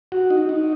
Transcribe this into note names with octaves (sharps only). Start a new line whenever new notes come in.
F#4
D#4
D#4